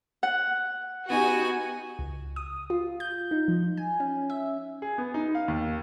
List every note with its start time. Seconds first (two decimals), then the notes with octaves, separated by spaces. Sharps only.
0.23 F#5
1.10 B3 D#4 F#4 G4 G#5
1.99 C#2
2.36 D#6
2.70 F4
3.00 G6
3.31 D#4
3.48 F3
3.77 G#5
4.00 C#4
4.30 E5
4.82 G#4
4.98 B3
5.14 D#4
5.35 F5
5.48 D#2